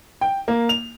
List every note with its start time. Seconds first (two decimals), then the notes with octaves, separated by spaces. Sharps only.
0.21 G5
0.48 A#3
0.69 F7